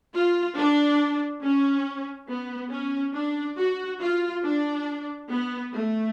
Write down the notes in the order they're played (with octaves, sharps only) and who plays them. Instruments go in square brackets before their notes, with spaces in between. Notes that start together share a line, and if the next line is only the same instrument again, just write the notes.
[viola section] F4
D4
C#4
B3
C#4
D4
F#4
F4
D4
B3
A3